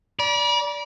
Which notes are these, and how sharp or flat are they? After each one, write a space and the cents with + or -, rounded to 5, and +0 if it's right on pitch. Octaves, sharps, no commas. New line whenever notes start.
D5 -15 B5 -45